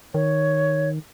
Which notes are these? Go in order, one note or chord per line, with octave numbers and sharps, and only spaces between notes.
D#3 C#5